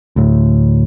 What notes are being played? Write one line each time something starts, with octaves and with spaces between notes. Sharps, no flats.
D2 A2